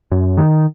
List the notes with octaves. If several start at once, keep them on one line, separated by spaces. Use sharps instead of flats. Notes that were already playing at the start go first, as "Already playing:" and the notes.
F#2
D#3